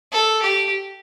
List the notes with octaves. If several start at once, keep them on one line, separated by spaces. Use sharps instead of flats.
A4
G4